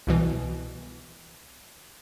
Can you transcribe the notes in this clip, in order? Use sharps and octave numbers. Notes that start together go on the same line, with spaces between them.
C2 B2 E3